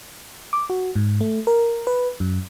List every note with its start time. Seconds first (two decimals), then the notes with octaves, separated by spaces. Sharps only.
0.53 D6
0.70 F#4
0.96 G#2
1.21 A3
1.47 A#4
1.87 B4
2.20 F#2